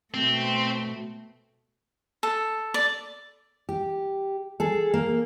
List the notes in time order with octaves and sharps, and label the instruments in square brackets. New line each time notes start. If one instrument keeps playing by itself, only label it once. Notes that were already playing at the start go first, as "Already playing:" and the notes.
[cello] B2 A3 [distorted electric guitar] C4
[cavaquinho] A4
D5
[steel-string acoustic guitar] G4
G#4 A4
A#3